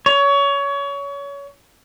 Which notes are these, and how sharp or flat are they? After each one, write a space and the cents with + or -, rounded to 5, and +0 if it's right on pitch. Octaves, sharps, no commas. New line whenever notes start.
C#5 +25